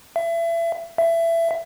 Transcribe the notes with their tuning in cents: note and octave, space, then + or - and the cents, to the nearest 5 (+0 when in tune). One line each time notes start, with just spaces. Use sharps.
E5 +30
E5 +20